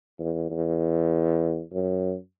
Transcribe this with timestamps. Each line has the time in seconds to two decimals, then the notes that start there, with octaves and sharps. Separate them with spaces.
0.19 E2
0.50 E2
1.73 F#2